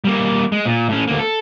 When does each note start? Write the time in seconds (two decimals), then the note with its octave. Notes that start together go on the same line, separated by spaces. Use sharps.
0.04 G3 A#3
0.52 G#3
0.66 A#2
0.89 A2 C#4
1.07 D2 A#3
1.19 A4